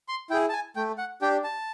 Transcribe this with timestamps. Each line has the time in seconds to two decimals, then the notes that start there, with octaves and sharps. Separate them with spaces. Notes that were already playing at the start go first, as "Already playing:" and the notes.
0.08 C6
0.30 E4 G5
0.33 G#4
0.49 A5
0.53 G#5
0.76 A3 G5
0.98 F#5
1.21 D4 G4 G5
1.44 A5